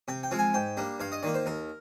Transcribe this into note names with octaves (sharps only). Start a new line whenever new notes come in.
C3 G5
G5
F3 G#3 C4 F4
G#5
G#2 G5
G3 A#3 D4
G2 F5
D#5
D#3 A#3 F4 D5
C5
D#2 A#4